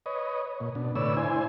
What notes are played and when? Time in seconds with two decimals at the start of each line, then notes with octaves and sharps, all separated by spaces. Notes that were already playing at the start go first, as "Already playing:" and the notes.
0.06 B4 C#5 D#5
0.60 A#2
0.75 B2 D4
0.96 A2 D3 B4 C#5 D5 E6
1.17 D4 E4 C5 G#5